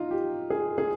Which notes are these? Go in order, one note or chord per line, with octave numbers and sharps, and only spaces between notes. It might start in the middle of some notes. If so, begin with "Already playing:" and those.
Already playing: D#4 F4
G4
G#4
G#4